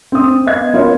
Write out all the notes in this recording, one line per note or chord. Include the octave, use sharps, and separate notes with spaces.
C4 D#6
B3 D#5 F5 G#6
F3 B3 F4 A#4 C#5